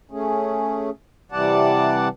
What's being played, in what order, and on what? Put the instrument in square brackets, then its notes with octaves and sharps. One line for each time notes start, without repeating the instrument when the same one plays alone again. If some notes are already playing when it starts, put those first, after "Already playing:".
[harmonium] A3 C#4 G#4
C3 E3 G3 D5 F#5 A5